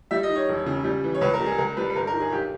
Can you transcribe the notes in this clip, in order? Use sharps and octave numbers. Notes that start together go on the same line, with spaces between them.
G3 E5
D#5
D#3
C#5
E1
C#3
G3
E3
C#5
C#2 B4
A#4
G3
G#4
C#2 A#4
G3 B4
B4
G1 A#4
A#4
D#3
G#4
B1 G4